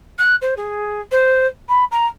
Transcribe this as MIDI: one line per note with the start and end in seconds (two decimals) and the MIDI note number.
0.18 0.36 90
0.42 0.55 72
0.57 1.01 68
1.12 1.47 72
1.69 1.85 83
1.91 2.06 82